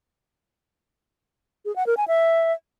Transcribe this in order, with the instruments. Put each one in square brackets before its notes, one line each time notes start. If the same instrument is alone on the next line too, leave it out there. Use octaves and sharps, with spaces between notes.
[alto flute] G#4
F#5
A#4
G#5
E5